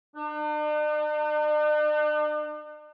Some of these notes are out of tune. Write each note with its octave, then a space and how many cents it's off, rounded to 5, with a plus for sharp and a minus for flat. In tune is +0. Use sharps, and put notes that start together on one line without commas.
D4 +45